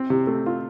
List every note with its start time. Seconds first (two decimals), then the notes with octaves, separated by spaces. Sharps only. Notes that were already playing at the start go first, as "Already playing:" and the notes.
Already playing: C4
0.10 C3
0.27 A3
0.46 F4